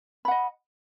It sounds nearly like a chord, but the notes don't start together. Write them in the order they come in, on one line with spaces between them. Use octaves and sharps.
B5 F#5 D#5